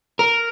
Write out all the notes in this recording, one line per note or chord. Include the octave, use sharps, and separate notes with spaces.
A#4